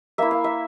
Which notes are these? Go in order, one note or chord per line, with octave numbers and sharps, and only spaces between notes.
A#3 E4 E5
F5
E5